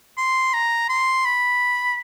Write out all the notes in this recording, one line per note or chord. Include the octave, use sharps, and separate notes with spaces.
C6
A#5
C6
B5